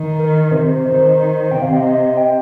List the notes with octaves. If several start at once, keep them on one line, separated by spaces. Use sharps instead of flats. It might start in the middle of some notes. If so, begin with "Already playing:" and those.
Already playing: D#3
A#4
C3 C5
D#3
C3 G5
F5
D#5
G5